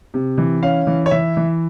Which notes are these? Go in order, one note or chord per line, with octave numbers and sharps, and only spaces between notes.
C3
E3
C#4 F5
E3
C#5
E3 E5
E3